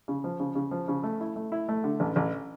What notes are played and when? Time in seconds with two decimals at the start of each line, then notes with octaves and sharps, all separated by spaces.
0.08 C#3
0.24 F3
0.40 C#3
0.55 C#3
0.71 F3
0.88 C#3
1.03 A3
1.20 E4
1.36 A3
1.52 E4
1.68 A3
1.84 D3
2.00 A1
2.16 A1